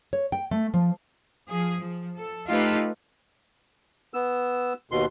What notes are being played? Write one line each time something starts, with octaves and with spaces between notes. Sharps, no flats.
C#5
G5
A3
F3
F3 G#4
F3
A4
A3 D#4 F4 G4 A4 B4
B3 E6
D#2 B2 C6